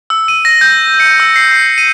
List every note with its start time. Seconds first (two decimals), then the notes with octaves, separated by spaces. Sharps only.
0.10 E6
0.28 D#7
0.45 A#6
0.61 G6
1.00 C#7
1.20 E6
1.36 C7
1.51 C7
1.78 D#7